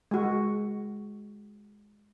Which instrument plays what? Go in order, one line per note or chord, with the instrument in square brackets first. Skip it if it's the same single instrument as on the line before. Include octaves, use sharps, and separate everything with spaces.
[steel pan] G#3 F#4